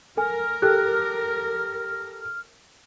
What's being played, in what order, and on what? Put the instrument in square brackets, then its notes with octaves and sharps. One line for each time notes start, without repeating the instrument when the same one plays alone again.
[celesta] A4 G#5 [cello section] A#4 [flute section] F6
[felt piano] G4 A4 [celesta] F#6